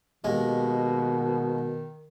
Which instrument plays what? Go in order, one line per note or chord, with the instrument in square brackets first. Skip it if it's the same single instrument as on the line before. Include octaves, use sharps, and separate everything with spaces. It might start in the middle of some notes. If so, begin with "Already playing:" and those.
[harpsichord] D#2 G#3 [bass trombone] B2 [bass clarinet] D#3